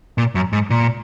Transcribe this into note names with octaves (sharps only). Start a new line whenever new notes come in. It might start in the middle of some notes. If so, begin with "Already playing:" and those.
A#2
F#2
G#2
A#2